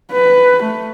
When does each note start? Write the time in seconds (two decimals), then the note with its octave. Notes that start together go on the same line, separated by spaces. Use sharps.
0.12 B4
0.64 A3